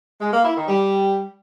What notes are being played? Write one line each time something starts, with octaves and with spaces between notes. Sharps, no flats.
G#3
A#3
E4
D#3
G3